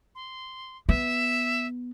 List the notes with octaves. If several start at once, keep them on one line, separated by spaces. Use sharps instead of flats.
C6
B3 E5